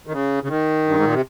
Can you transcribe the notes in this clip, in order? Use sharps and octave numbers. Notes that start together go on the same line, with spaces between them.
D#3
C#3
C#3
D#3
G2
G#2
A#2
C3